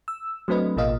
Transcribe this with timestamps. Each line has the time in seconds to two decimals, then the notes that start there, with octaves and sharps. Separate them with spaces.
0.08 E6
0.48 F#3 A3 C4 D4 B4 D#5
0.76 A1 B2 A#3 F4 D#5 F5